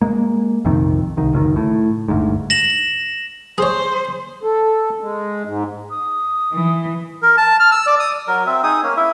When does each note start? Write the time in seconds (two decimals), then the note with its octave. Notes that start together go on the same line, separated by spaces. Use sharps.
0.02 G#3 A#3
0.65 A#1 F2 C3 D#3
1.17 C2 D#3
1.33 F#1 C#2 D#3
1.56 A2
2.08 G1 D2 G#2
2.50 A#6 E7 F#7
3.58 G#4 C5 C#5
4.43 A4
5.01 G#3
5.45 G#2
5.91 D#6
6.53 E3
7.22 A#4
7.38 A5
7.60 F6
7.72 E6
7.87 D5
8.00 D#6
8.28 F#3 A#4
8.46 C4 E5
8.63 D#4 G#4 D#6
8.83 A#3 C#4
8.97 E4 E5